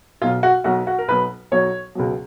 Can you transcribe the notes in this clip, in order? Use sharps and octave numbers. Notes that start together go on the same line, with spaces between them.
B1 B2 F#3 F4
F#4
B1 B2 F#3 F#4
F#4
A#4
B1 B2 F#3 B4
B1 B2 F#3 C#5
C#2 B2 F#3